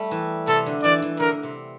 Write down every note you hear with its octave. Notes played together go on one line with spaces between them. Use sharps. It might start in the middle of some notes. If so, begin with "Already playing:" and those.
Already playing: G3 A3
E3
C3 A4
D3
E3 D5
E3
D3 A#4
D3
C3